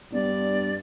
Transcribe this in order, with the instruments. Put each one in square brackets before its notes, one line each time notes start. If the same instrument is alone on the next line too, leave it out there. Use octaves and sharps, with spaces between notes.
[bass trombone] G2 [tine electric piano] B3 D4 [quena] D5